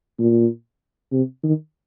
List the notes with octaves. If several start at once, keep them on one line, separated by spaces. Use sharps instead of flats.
A#2
C3
D#3